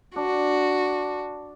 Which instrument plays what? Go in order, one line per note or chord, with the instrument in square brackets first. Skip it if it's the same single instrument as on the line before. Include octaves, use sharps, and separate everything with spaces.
[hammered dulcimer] D4 [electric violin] F#4